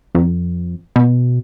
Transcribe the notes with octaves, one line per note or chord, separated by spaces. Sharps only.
F2
B2